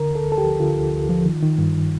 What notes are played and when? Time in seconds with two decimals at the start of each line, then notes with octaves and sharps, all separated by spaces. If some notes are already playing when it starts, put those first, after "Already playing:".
Already playing: D3 A#4
0.11 D2 A4
0.27 D2
0.32 A4
0.38 G4
0.43 F3
0.60 D3 F4
0.77 D2
0.93 D2
1.09 F3
1.26 D#3
1.43 D#3
1.58 G2